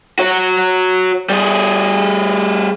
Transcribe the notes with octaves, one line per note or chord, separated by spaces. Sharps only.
F#4 C#5
G3 G#4